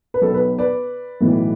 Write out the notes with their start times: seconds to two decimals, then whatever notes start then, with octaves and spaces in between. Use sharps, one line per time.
0.14 B4
0.22 B1 B2 A4
0.34 B4
0.59 B4 D5
1.21 B1 A2 E3